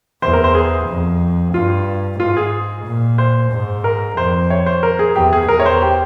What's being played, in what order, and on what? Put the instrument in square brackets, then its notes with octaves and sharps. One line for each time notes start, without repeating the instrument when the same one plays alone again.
[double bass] E2 [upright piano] C5
[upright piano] A#4
C5
G#4
[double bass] F2
[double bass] G2 [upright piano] F4
[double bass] G#2 [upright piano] F4
[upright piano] G#4
[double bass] A#2
[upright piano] C5
[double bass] G#2
[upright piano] A#4
[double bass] F2 [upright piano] C5
[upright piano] C#5
C5
A#4
G#4
[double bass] E2 [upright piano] G4
[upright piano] G#4
[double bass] E2 [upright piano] A#4
[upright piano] C#5
C5
G4